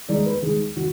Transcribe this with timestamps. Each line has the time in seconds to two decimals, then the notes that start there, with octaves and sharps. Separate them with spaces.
0.09 D#3 G#3 D#4 D5
0.26 B4
0.42 D#3 G#3 D#4 G#4
0.77 D#3 F#4